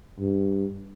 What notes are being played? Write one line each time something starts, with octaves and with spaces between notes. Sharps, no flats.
G2